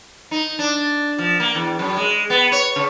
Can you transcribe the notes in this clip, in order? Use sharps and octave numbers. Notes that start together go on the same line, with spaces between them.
D#4
D4
F3
A#3
E2
F#2
G#3
B3
C#5
C#3